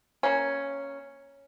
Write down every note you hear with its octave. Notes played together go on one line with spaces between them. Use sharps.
A#3 C#4